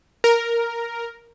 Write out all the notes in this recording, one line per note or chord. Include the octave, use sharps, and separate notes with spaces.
A#4